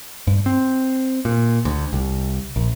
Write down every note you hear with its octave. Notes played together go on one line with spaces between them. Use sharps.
G2
C4
A#2
D2
C2
A#1